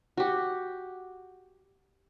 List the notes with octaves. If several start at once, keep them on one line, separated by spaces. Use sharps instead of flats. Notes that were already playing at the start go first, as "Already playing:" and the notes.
F#4 G4